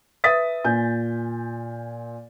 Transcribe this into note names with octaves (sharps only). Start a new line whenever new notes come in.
B4 E5 D#6 A6 B6
A#2 G#5 G6